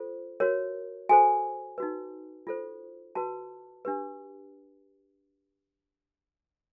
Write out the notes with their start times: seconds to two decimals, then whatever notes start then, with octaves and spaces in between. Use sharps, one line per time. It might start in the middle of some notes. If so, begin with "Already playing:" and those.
Already playing: F4 A4 C5
0.40 F#4 A#4 C#5
1.09 F#4 A4 C5 G#5
1.78 D#4 F#4 B4
2.47 F4 A4 C5
3.15 F#4 B4 A5
3.85 D4 G4 B4